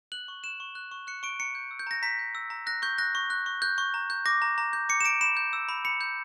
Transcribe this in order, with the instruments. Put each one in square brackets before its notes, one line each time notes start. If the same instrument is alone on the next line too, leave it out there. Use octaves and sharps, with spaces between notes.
[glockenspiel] F#6 F#7
C#6
F#6 E7
C#6
F#6
C#6
F#6 C#7
C#6 D7
A#5 C#7
G6
E6
G6
A#5 A#6
A#5 B6
G6
E6
A#5
F#6 A#6
C#6 G6
F#6 A#6
C#6
F#6
C#6
F#6 G6
C#6
A#5
G6
D6 A#6
A#5
A#5
G6
D6 C#7
E7
A#5 D7
B5 E7
G6
E6
B5
B5 C#7
G6